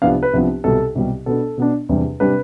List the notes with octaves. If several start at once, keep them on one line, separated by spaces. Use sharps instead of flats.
C2 C3 F3 B3 D4 F5
B4
C2 C3 F3 B3 D4
C2 B2 G3 A4
C2 B2 G3
B2 B3 D4 A4
B2 B3 D4
E2 C3 G3 D4
C3 G3 D4 B4